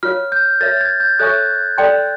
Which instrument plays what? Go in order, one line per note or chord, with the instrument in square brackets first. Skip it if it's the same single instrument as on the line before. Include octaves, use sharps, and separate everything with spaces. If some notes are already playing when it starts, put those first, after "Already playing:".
[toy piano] F4 A#4 C#5 F5 [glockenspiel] F6
[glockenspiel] G6
[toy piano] A#4 C#5 E5 [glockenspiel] A6
[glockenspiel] A6
G#6
G6
[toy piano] A4 C#5 E5 G#5 C#6 [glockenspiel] F#6
[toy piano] A4 D5 G5 C6